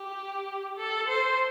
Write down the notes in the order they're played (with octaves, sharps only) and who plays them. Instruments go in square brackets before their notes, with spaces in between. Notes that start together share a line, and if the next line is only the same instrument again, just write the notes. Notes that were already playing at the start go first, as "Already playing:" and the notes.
Already playing: [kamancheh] G4
A4
C5